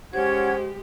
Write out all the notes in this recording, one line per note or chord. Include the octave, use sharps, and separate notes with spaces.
G#3 C#4 G4 C5 F#5 G#6